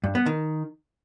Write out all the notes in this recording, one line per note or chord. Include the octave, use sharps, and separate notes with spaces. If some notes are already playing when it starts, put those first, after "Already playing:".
G2
B3
D#3